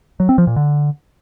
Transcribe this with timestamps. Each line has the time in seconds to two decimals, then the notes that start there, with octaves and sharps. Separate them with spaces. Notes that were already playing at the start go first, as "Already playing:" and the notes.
0.20 F#3
0.29 C4
0.38 F3
0.47 A#2
0.56 D3